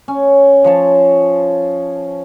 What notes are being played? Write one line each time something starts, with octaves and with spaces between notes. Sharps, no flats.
C#4
F3 C#5 A5